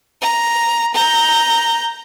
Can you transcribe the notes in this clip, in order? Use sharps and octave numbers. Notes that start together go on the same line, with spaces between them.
A#5
A#5 G6